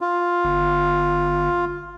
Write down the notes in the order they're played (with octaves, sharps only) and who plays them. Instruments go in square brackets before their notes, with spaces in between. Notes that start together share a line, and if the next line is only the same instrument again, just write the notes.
[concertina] F4
[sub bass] G1